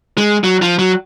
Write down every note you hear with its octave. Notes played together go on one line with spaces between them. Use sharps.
G#3
F#3
F3
F#3